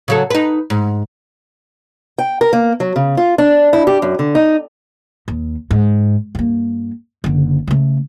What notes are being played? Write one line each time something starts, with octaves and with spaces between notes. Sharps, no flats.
C#3 F#3 A4
D#4 B4
G#2
G5
A#4
A#3
F#3
C#3
F4
D4
E4
G4
F#2
D3
D#4
D#2
G#2
G2 A#3
F#1 D3
C#3 A3